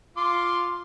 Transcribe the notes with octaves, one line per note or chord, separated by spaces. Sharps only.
F4 C6 D6